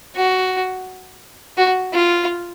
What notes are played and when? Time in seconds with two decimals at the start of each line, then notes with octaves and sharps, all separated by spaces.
0.16 F#4
1.58 F#4
1.93 F4